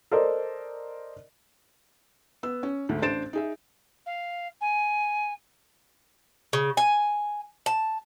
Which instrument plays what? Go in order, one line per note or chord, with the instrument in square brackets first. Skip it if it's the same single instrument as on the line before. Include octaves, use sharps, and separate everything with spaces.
[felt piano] A4 A#4 C5 D5 D#5
B3 E6
C#4
D2 G#2 D3
A1 D4 C5 A6 D7 E7
D#4 G#4 E5
[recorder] F5
G#5
[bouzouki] C#3
G#5
A5